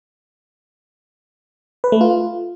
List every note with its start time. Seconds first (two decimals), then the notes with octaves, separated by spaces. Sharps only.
1.84 B4
1.92 A3
2.01 F4